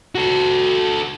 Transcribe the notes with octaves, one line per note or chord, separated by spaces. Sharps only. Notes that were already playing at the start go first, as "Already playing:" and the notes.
F#4 A4